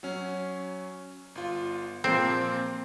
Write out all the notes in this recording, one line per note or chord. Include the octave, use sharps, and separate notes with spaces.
F#3 C#4
G1 F4
A#2 F3 A#3 C4